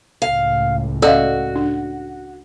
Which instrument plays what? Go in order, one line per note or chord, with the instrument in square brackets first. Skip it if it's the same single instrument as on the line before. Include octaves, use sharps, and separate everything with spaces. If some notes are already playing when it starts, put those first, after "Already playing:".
[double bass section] C#2 A2 [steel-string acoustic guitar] F5
[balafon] C#4 D#5 F5 [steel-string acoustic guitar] F#4 [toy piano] A4 D5 E6
[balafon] D4